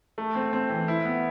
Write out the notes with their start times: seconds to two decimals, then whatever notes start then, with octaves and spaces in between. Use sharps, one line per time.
0.18 A3
0.35 C4
0.53 C4
0.70 E3
0.88 E4
1.05 B3